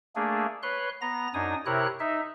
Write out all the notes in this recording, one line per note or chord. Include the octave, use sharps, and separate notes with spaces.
A3 A#3 D4 G#4
B4 C#5 C6 F#6
B3 A#5 A#6
F#2 D4 D#4 G#5 D#6
C3 E4 A#4 C#5 F#6
D#4 E5